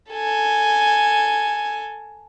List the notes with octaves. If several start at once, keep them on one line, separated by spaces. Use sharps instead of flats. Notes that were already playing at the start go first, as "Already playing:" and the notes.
A4 G#5